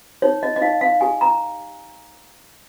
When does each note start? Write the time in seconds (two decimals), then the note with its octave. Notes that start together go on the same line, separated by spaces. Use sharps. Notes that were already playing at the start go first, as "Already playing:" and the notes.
0.22 D#4 C#5
0.43 D#5
0.56 D#5
0.62 D#4 F5
0.81 F5
1.01 G4 G#5
1.21 A#5